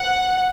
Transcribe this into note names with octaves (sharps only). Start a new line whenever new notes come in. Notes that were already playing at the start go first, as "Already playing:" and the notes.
Already playing: F#5